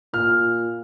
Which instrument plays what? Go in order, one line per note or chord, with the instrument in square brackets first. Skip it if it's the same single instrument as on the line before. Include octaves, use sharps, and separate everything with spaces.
[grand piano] A#2 F6